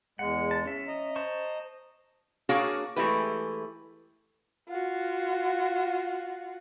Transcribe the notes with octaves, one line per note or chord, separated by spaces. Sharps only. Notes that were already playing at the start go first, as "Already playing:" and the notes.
E2 G#3 F#5
A5
C#4 E5
D#5 A#5
C5 A5 C#6
A#3 D4 F#4 G#4 C#5 F5
E3 G#3 A3 E4 G4 B4
F4 F#4